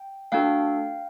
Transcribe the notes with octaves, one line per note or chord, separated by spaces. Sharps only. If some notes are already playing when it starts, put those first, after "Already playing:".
Already playing: G5
A3 D4 F#4 A4 F5 G5